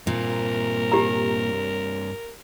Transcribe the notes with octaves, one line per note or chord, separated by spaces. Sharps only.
G2 A#2 C4 A#4
G4 A#5